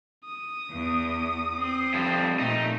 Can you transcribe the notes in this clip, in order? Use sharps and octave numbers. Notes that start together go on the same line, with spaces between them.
D#6
E2
C4
F2 G3
A#2 A3 D#4